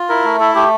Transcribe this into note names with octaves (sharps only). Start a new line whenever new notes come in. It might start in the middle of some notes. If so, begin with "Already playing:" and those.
Already playing: F4
E4 A#4
A3
E4 A4
A3 G4